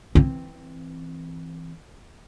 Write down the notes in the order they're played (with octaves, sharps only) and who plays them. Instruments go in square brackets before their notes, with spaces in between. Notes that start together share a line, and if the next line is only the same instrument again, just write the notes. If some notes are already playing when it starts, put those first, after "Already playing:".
[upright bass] E3 C4